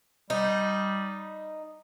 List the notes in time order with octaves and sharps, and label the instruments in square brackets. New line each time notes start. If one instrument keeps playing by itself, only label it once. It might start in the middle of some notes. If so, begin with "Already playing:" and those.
[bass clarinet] G3 [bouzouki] D#4